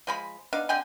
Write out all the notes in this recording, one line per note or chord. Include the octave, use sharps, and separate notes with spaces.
F3 G#3 B5
B3 D4 D#4 F5
D3 C4 G5 G#5